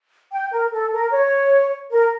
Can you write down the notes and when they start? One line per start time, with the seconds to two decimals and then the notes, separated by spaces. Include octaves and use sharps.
0.32 G5
0.52 A#4
0.72 A4
0.93 A#4
1.12 C#5
1.92 A#4